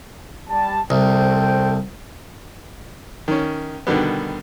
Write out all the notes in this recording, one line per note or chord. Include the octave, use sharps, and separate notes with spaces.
G3 A5
C2 A4 C5 G5
D#3 C#4
B2 D3 D#3 G3 B3